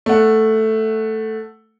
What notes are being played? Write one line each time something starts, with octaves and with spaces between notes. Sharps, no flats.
A3 F#5